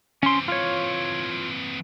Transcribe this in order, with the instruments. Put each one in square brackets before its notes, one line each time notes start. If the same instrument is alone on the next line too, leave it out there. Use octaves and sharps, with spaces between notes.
[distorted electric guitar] E3 C4 [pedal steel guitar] C#4 C6
[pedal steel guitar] F4 C#5